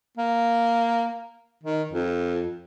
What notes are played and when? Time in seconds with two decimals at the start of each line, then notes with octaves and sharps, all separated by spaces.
0.17 A#3
1.63 D#3
1.92 F2